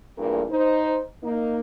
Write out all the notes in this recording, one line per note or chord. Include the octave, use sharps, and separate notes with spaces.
E2 G2 A#2 A3 A#4
D#4 C5
A#3 D#4